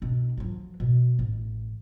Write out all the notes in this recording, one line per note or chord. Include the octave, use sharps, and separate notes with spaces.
B2 D4
F3 F#3
B2
A1